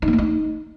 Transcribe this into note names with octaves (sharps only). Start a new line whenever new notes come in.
D#4
B3
A3
D#4